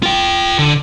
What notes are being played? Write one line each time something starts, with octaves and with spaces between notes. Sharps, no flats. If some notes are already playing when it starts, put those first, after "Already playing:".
F4 G5
D3